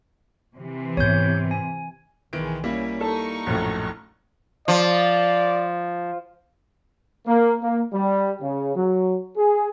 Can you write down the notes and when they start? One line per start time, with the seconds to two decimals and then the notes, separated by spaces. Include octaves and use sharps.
0.56 C3 E3
0.97 G#2 B3 C#5 G6
1.51 G#5
2.33 B1 D#3 E3 G#3 D7
2.64 G3 A#3 C#4 E4
3.01 D#4 A4 C#6
3.46 A#1 F#2 A2
4.68 F3 D5
7.28 A#3
7.62 A#3
7.93 G3
8.42 C#3
8.76 F#3
9.37 G#4